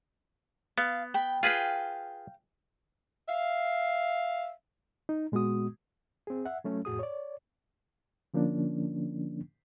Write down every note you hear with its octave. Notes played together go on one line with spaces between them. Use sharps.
B3 F5
G5 B5
F4 G#4 B4 F5 G5
E5 F5
D#4
A#2 G#3 B3 F#4 D#6
C4 G#4
E5 F#5
F#3 A3 C#4
F2 A2 F#4 G#4 D#6
C#5 D5
D3 F3 A#3 C#4 D4